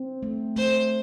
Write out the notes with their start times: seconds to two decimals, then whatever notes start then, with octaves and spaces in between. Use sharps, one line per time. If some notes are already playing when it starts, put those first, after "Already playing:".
Already playing: C4
0.23 A3
0.56 A3 C5